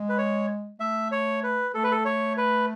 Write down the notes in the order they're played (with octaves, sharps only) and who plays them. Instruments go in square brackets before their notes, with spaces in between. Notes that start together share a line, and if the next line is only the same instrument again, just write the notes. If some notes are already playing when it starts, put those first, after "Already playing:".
Already playing: [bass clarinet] G#3
[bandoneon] B4
C#5
[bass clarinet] A3 [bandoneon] E5
[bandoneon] C#5
B4
[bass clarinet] A3 [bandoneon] A4
[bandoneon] B4
A4
C#5
B4